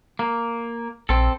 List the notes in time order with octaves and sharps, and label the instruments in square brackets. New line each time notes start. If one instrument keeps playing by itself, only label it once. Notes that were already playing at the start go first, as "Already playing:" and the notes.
[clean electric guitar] A#3
[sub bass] A#1 [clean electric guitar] C4 A4